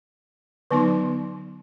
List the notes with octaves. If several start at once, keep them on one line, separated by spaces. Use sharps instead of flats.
D3 F#3 B3 D#4